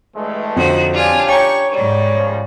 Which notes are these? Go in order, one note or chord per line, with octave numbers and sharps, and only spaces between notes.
G2 E3 G#3 A3
F2 D3 F3 D#4 F#4
C#4 D4 F4 G4 D5 G#5
C#5 G5 G#5 A#5 C#6
G#2 G3 C#5
C#3 F3